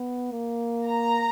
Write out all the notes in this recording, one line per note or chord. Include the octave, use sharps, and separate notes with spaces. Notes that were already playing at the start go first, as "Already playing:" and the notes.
Already playing: B3
A#3
A#5